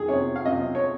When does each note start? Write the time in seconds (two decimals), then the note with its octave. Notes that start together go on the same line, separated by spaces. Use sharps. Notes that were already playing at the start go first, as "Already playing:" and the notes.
Already playing: D#3 G#4
0.08 C3 C#5
0.36 F5
0.45 C3 D#5
0.75 C#5